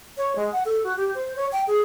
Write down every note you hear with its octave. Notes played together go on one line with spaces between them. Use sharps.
C#5
G#3
F#5
A4
F#4
G4
C5
C#5
G5
G#4